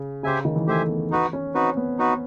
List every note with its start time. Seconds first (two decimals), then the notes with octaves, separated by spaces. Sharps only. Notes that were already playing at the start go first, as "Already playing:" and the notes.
Already playing: C#3
0.23 C#3 G4 C5 E5 G#5
0.45 D#3
0.56 E3
0.67 A3 G4 C5 E5 G#5
0.89 B3
1.11 D#4 F#4 B4
1.33 C#4
1.54 C4 D#4 F#4 B4
1.77 B3
1.98 D#4 F#4 B4